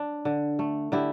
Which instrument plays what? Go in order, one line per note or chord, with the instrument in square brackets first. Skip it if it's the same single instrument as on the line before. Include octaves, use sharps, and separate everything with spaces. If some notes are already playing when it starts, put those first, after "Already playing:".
Already playing: [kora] D4
D3
A3
D3 E4 G4